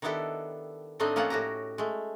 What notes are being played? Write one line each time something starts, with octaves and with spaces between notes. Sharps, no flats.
D#3 B3 D4 E4 G4 A4
A2 A3 C4 D4 D#4 D#5
F3 A#3 C#4 F4 A4 F#5
A2 F#4 G4 A#5
G#3 A3